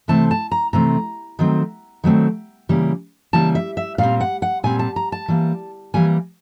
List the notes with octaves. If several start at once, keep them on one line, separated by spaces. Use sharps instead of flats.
C3 E3 A3 C4 A5
A5
A#5
C3 E3 A3 C4 A#5
D#3 F#3 A3 C4
D#3 F#3 A3 C4
C#3 E3 G3 A#3
C#3 E3 G3 A#3 A5
E5
E5
A#2 G3 C4 F5
F#5
F#5
A#2 G3 C4 G#5
A5
A#5
A5
E3 G3 A#3
E3 G3 A#3 G#5